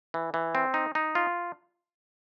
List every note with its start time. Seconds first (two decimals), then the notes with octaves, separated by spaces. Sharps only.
0.14 E3
0.34 E3
0.55 C4
0.74 D#4
0.95 D#4
1.15 F4